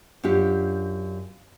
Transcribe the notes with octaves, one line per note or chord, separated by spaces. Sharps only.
F#2 D4 F4 G4